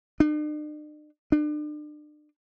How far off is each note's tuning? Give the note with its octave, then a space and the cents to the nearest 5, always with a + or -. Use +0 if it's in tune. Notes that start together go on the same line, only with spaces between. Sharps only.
D4 +45
D4 +35